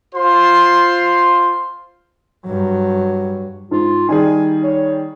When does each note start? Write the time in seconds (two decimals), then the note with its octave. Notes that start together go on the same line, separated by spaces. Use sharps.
0.15 F4 C5 C6
2.46 G2 F#3
3.71 G#2 F4
4.09 D#3 G3 G#4 G#5
4.63 C#5